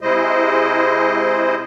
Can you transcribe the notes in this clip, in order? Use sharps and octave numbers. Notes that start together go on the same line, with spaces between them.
C3 G#3 E4 C5 D#5